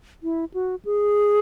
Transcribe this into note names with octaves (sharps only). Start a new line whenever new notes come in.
E4
F#4
G#4